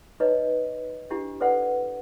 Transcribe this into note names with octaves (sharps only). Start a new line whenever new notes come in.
D#4 B4 C#5 D#5
D4 E4 G4
A4 B4 C5 D5 F#5